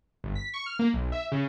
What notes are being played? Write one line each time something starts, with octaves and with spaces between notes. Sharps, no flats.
G1
B6
C#6
F6
A#3
B1
E5
C#3